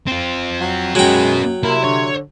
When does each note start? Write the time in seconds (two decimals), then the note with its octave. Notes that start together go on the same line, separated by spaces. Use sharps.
0.08 C4 F4
0.60 F#3
0.95 F#2 F#3 G#3 B3 F#4 G5
1.63 C3 A#3 E4
1.84 D3 C#5